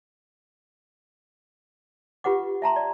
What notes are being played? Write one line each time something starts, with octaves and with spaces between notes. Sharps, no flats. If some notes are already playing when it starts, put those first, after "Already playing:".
F4 G4 B4 F#5 D6
E5 A5 A#5 C6
D5